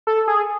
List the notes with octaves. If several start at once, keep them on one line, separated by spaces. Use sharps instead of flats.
A4
G#4